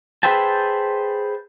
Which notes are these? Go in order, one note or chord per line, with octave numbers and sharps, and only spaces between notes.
G#4 B4 C5 E5 G5 A5